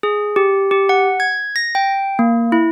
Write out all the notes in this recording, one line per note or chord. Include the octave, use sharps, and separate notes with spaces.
G#4
G4
G4
F#5
G#6
A#6
G5
A#3
E4